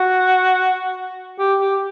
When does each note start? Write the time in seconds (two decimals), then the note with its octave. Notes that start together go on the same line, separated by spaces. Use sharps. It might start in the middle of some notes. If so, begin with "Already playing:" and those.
Already playing: F#4
1.39 G4
1.61 G4